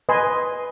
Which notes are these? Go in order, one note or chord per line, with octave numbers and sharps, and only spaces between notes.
B4 D#5 G#5 C6